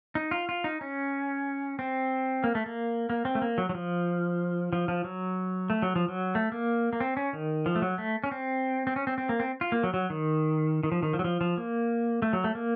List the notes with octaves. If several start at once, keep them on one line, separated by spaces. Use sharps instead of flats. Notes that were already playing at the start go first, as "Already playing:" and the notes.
D#4
F4
F4
D#4
C#4
C4
A#3
A3
A#3
A#3
C4
A3
A#3
F#3
F#3
F3
F3
F3
F#3
A3
F#3
F3
F#3
A3
A#3
A#3
C4
C#4
D#3
F3
A3
F#3
A3
C#4
C4
C4
C#4
C4
C4
A#3
C4
F4
A#3
F#3
F#3
D#3
D#3
F3
D#3
F3
F#3
F3
F3
A#3
A3
F#3
A3
A#3